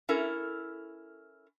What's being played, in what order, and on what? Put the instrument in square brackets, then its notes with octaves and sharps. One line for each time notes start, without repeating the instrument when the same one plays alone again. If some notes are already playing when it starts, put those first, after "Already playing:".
[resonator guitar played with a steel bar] C#4 E4 A4 A#4